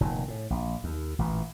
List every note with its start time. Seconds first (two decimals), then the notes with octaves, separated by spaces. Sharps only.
0.01 F1 A#2 D#3
0.28 A2
0.50 A#1
0.84 D#2
1.19 A1 A#2 E3